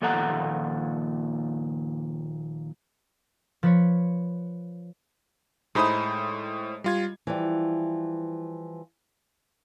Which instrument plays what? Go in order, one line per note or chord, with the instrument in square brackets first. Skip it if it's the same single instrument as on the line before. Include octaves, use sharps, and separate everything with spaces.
[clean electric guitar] D#2 A#2 F3 A4 F#5 A#5
[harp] F3 B4 C#5
[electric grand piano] A2 C5 D#6 [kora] G#3 D#4 E4
[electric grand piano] G3 F4 G#6
[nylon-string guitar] E3 F3 G3